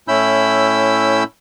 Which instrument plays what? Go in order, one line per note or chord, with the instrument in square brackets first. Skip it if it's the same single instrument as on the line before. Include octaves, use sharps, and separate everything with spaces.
[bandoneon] A2 C#4 E4 B5 E6 G6